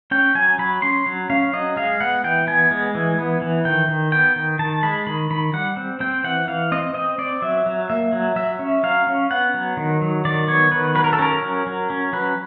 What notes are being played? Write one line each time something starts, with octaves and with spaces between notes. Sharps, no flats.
C#4 G5
F#3 G#5
F#3 B5
C#4 C6
F#3
C#4 F5
F#3 D#5
G#3 F5
B3 F#5
E3 G5
B3 G#5
G#3
E3
B3
E3
D#3 G5
D#3
B3 G5
D#3
D#3 A5
G#3 B5
D#3 B5
D#3 B5
G3 F#5
C4
C4 G5
E3 F#5
E3 F5
C4 D#5
C4 D#5
C4 D5
F#3 E5
F#3
A#3 E5
F#3
F#3 E5
C#4
F#3 F5
C#4
B3 F#5
F#3
D#3
F#3
D#3 D5
B3 C#5
D#3 B4
F#3 B4
A#4
A4
C#4 A#4
F#3
F#3
C#4
F#3 B4